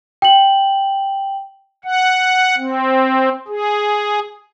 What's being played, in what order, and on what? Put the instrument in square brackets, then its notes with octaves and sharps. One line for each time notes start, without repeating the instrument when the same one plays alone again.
[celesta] G5 F#7
[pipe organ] F#5
C4
G#4